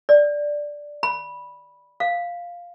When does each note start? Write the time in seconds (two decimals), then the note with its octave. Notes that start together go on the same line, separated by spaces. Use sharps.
0.09 D5
1.03 B5
2.00 F5